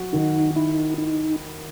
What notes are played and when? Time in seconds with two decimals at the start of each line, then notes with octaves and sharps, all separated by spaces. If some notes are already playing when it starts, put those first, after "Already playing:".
Already playing: F#3 F#4
0.13 D#3 D#4
0.56 D#4 E4
0.98 D#4 E4